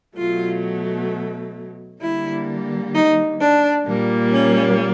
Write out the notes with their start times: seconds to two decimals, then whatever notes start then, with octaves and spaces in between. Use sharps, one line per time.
0.17 B2 F#3 A3 F4
2.02 D3 G3 A#3 E4
2.94 D#4
3.41 D4
3.87 A#2 G3 A#3
4.32 C#4